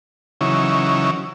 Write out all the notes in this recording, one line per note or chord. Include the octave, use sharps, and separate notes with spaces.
C#3 E3 F#3 C#4 D#4 E4